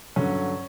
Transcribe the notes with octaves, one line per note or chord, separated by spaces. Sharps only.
G2 D3 F#3 C#4